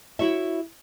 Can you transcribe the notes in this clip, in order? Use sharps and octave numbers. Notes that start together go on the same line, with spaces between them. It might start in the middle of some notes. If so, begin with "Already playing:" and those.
E4 F#4 C#5 E5